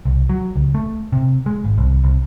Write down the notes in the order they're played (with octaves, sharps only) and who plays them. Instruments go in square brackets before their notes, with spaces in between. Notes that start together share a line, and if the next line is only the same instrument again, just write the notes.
[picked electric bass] C2
F#3
C#2
A3
C3
G#3
G#1
C2
C2